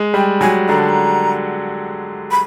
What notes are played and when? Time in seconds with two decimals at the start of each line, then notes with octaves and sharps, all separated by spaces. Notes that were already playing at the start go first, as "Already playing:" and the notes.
Already playing: G#3
0.14 G3 G5
0.41 F#3 G#5
0.69 D3 A#5
0.78 A5
0.89 A#5
2.31 B5